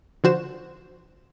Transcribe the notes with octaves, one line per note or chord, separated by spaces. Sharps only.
D3 F3 F#4 C5 E7